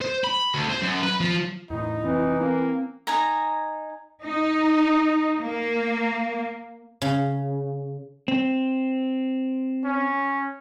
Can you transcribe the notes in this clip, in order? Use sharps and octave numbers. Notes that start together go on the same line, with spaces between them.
C5
B5
D2
C5
F#2
B4
F3
E2 A2 D#4 E4
F1 E3 C4
A#3 C4
D#4 G#5 A#5
D#4
A#3
C#3
C4
C#4